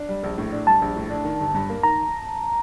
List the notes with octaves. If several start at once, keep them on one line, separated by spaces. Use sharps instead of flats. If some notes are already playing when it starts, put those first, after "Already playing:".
Already playing: D4
G3
A#1
A2
D4
G3 A5
A#1
A2
D4
D#3
G1
G2
A#3
D#3 A#5